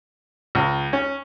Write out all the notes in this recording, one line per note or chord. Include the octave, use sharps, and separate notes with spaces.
C#2
C#4